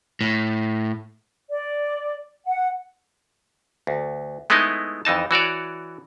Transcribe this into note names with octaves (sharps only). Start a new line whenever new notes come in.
A2
D5
F#5
D2
G#3 A3 B3 D#4 E4 D#5
F2 E3 D#4 A5
E3 F#4 C#5 D5